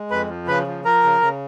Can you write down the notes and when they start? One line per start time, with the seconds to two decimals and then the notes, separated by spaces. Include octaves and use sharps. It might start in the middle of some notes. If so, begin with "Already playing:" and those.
Already playing: G#3
0.10 F2 B4 B5
0.30 F3
0.47 C#3 B4 B5
0.66 F3
0.85 F3 A#4 A#5
1.03 C#3
1.21 C#3